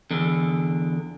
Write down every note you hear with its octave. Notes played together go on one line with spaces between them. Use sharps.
E2 D3